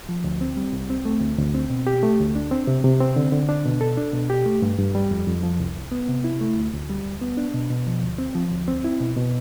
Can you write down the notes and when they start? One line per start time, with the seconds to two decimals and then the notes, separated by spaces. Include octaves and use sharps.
0.09 F3
0.24 D2
0.41 C4
0.57 G3
0.73 C2
0.90 C4
1.05 A3
1.21 D2
1.38 D2
1.54 C4
1.70 B2
1.87 G4
2.03 A3
2.19 D2
2.35 D4
2.51 C4
2.67 C3
2.84 C3
3.00 C4
3.16 D3
3.32 D3
3.49 D4
3.65 B2
3.81 A4
3.97 D4
4.13 B2
4.30 G4
4.46 A3
4.62 G2
4.79 G2
4.95 G3
5.11 F2
5.27 F2
5.43 F3
5.60 C2
5.76 C2
5.92 B3
6.09 C3
6.24 E4
6.41 A3
6.57 D2
6.73 D2
6.89 G3
7.06 D2
7.21 B3
7.37 D4
7.54 B2
7.71 B2
7.87 F3
8.03 D2
8.18 C4
8.35 F3
8.51 D2
8.68 C4
8.84 E4
9.00 B2
9.17 B2